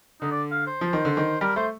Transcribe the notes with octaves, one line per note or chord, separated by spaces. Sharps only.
D3 D#4
D5
F5
C5
F3
D#3
D3
D#3
G3 A#4
A3 C5